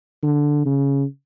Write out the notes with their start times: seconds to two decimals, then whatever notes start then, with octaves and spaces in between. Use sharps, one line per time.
0.23 D3
0.66 C#3